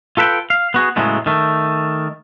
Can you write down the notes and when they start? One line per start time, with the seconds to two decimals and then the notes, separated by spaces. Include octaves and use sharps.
0.17 F4 A4 B4 E5 G5
0.50 F5
0.74 B3 F#4 G#4
0.96 A2 C#3 F#3 G#3 A3 B3
1.26 D#3 A3